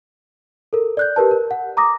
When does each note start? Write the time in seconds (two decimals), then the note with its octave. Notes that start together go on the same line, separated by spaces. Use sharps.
0.73 A4 A#4
0.97 D5 F#6 G6
1.16 G4 A#4 B4 A5
1.31 A#4
1.51 F#5
1.77 A#5 D6 D#6 A#6